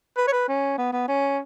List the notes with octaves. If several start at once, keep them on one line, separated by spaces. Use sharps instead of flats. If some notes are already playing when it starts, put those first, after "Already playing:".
B4
C#5
B4
C#4
B3
B3
C#4